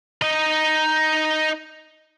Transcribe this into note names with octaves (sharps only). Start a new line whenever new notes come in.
D#4 D#5